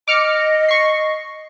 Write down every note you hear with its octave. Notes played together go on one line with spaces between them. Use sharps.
D#5 D6 F6 C#7
C#6 C7